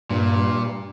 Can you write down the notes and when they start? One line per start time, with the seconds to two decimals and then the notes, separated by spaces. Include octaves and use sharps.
0.10 G2 A#2